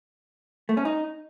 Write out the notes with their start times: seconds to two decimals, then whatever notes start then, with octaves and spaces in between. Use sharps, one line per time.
0.69 A3
0.77 C#4
0.85 D#4